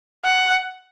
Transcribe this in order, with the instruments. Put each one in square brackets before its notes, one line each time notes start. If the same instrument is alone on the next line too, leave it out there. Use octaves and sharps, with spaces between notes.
[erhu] F#5